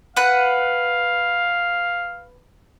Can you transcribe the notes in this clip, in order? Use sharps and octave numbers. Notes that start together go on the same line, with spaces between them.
B4 F5 F#5